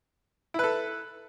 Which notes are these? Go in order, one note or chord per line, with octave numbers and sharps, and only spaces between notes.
E4 A4 B4